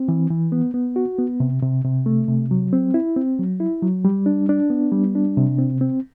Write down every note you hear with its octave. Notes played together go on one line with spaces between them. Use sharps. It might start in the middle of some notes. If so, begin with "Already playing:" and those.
Already playing: C4
E3
E3
B3
B3
F#4
B3
C3
C3
C3
A3
C3
F#3
C4
E4
C4
F#3
E4
F#3
G3
D4
D4
B3
G3
D4
C3
C4
C4